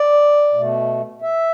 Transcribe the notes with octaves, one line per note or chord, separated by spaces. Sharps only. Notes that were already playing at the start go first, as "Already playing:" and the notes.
Already playing: D5
B2 A3
E5